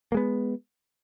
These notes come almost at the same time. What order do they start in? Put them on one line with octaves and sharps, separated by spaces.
A#3 G#3 B3